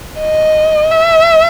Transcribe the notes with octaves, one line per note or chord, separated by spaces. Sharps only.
D#5
E5